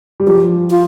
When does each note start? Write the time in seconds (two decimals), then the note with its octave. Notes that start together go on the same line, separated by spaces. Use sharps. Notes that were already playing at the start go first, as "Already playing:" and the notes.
0.20 G3
0.27 F3 G4
0.70 F4